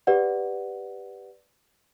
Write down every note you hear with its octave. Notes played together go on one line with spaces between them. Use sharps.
G4 B4 D5 F#5